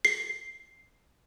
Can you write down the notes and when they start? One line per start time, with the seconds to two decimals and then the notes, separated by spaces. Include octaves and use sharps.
0.05 C7